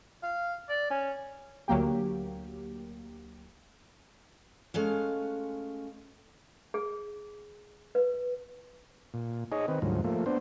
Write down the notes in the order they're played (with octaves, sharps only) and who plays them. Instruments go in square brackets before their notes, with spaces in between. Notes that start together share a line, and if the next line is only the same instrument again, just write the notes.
[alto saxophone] F5
D5
C#4
[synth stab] D2 F#3 A#3 G4
[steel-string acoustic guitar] G#3 A3 C#4 F5
[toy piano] G#4
B4
[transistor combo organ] A#2
D#4 G#4 C#5 D#5
D#3 C4 B4
D2 G#2 F3 F#3
F3 A3 A#3
B3 D4 C5